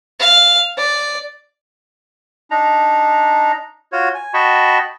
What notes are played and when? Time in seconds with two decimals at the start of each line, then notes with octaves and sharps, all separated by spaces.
0.20 F5
0.78 D5
2.51 D4 D#4 A#5
3.92 F4 F#4 C#5
4.15 G#5
4.34 F#4 D#5 G5 A5 B5 C#6